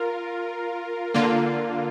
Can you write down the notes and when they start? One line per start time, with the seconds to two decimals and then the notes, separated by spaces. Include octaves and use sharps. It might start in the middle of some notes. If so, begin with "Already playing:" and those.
Already playing: F4 A#4
1.14 D3 A#3 F4